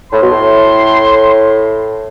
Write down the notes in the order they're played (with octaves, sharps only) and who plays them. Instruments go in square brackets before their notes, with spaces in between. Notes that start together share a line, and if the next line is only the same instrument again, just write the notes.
[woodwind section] A2 [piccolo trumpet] C6
[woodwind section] B2
A2